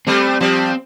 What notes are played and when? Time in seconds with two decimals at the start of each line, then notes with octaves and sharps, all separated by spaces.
0.07 G3 A3 C4
0.40 F3 G3 C4